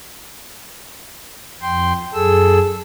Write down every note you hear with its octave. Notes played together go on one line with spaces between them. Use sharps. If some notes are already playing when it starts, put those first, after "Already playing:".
F2 G5 C6
F#2 G#4 A4 E6